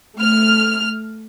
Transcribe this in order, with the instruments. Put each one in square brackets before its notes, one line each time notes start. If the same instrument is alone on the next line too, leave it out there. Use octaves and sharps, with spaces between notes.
[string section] A3 F6